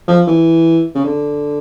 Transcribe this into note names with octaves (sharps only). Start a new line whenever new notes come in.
F3
E3
C#3
D3